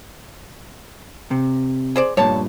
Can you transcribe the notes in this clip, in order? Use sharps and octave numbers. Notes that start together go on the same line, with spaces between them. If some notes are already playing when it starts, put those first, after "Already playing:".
C3
G#4 C5 D5
G2 A#2 C#5 A5